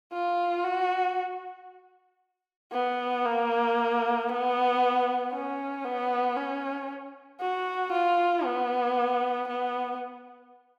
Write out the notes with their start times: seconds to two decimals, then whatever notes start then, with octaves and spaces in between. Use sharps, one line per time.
0.13 F4
0.65 F#4
2.73 B3
3.25 A#3
4.29 B3
5.32 C#4
5.84 B3
6.36 C#4
7.40 F#4
7.92 F4
8.44 B3
9.48 B3